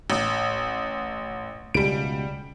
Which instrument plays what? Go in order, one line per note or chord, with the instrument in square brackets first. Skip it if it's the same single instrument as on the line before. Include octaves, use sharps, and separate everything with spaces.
[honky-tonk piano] A1
[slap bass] C#2 B2 [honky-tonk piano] G3 D7